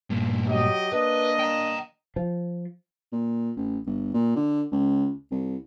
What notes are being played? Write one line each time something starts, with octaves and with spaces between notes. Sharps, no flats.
G2 A#2
F#3 G4 D#5
A#3 D4 B4 D#5
G5 A#5
F3
A#2
A1
G1
A#2
D3
C#2
C2